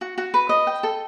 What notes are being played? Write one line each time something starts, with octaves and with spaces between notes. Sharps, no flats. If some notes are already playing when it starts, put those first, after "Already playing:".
F#4
F#4
B4
D#5
G5
A4